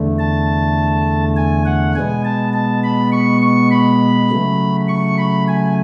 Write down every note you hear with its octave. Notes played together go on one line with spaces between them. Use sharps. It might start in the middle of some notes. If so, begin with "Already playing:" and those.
Already playing: E2 D3 A3
A5
G#5
F#5
B2 G#3 B3 G#5
A5
A5
B5
C#6
C#6
B5
C#3 F#3 A3
C#6
B5
G#5